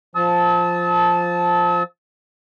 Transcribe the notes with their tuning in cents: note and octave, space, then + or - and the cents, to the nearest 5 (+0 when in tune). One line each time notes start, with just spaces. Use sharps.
F3 +0 A5 -10 E6 -45